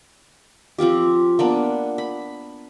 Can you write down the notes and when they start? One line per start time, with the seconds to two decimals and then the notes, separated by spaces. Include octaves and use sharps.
0.78 F3 C4 F4 G4
1.39 A#3 B3 D4
1.98 B5